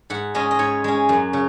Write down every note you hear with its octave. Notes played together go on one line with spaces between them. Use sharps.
G#2 F#5
G#3 C#4 D#5
D#5
G#2 C#5
G#3 C#4
F#2
C#3